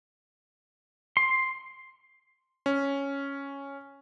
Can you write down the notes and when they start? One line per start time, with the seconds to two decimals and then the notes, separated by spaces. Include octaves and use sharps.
1.17 C6
2.66 C#4